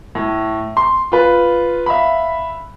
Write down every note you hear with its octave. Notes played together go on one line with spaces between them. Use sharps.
A2
C6
F4 B4
E5 F5 B5